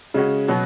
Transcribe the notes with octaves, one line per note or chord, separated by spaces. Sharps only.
C#3 G#3 C#4 F#4
B2 F#3 B3